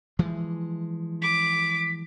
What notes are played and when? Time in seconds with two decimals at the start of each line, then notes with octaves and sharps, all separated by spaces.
0.19 E3 F3 G#3
1.22 D6 B6